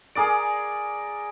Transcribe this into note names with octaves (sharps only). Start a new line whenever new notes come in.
G#4 A#4 D5 G#5 D#6 D7